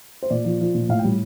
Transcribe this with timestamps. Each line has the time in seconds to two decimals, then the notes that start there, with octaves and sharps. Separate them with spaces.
0.23 C5
0.30 A#2 D5
0.45 F3
0.60 F3
0.75 A#2
0.89 A2 F5
0.99 G5
1.04 G3